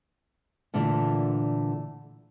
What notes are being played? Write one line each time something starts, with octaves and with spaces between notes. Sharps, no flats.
A#2 D3 E3 A3 D4 F4